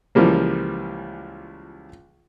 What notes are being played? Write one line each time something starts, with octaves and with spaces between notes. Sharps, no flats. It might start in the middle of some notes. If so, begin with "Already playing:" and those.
C#2 E3 F3 G3 A#3